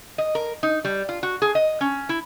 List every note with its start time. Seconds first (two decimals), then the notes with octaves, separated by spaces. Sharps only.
0.18 D#5
0.35 A#4
0.63 D#4
0.85 G3
1.09 F4
1.23 F#4
1.42 G#4
1.55 D#5
1.81 C#4
2.09 E4